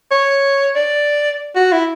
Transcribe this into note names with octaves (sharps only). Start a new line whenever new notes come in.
C#5
D5
F#4
E4